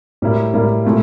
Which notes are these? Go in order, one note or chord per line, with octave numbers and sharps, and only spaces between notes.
A2 G3 A#3 E4
A2 G3 A#3 E4
A#2 A3 E4